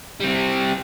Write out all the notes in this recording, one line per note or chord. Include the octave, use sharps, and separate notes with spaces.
G3 C4